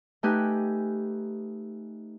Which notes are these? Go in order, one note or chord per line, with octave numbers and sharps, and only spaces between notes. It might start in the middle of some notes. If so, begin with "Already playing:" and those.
A3 D#4 G4 B4 G#5 F#6